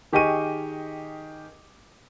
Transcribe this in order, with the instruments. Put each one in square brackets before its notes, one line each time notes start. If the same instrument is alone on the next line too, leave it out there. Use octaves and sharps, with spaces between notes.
[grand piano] D#3 G4 G#4 D#5 C#6 D#7